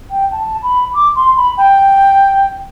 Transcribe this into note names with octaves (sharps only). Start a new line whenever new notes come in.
G5
A5
B5
D6
C6
B5
G5